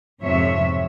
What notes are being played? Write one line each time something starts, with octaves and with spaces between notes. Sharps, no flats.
F2 G#2 C3 F3 C#5 E5